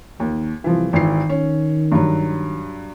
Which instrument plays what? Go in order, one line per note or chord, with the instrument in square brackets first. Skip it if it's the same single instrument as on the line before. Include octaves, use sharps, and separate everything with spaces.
[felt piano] D#2 [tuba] D#3
[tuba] C2 [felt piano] E3 F3
[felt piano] G#1 E3 C7 [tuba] D#3
[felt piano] C#4
G2 F#3